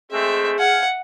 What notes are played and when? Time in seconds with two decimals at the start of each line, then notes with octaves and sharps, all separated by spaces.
0.12 G#3 A3 C4 G#4 E5
0.59 F5 F#5 G#5